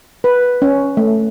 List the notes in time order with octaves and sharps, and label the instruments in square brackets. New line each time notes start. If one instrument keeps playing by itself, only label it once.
[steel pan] B4
C#4
A3